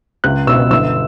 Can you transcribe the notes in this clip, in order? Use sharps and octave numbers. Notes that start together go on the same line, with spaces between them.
C#2 F#6
B2 E6
G1 E6